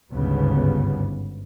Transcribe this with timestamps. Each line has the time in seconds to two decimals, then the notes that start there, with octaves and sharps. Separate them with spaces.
0.11 G1 D2 G#2 C#3 G3 B3